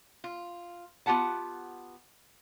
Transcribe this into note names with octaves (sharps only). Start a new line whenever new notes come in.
F4
B3 F4 G4 F#5 A5